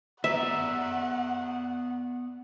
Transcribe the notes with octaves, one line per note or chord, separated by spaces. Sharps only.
B3 D5 E5 F#5 A#5